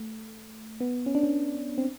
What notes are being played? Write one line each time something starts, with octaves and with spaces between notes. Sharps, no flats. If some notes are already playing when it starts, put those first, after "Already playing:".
Already playing: A3
B3
C#4
D4
C#4
C4